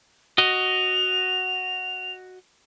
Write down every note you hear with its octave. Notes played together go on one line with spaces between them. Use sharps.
F#4 D#5 F7